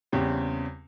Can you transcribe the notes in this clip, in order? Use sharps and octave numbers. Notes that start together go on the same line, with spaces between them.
E2 C#3 G3 C4